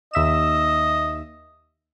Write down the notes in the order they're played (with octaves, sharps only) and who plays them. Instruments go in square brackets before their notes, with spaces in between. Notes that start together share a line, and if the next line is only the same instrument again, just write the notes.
[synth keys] D#2 E5 E7 [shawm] D#5